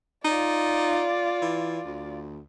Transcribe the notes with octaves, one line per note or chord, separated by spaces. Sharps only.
D#4 F4 D5
E3
D2